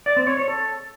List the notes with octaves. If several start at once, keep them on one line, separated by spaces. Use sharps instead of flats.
D5
C4
C#5
C#5
A4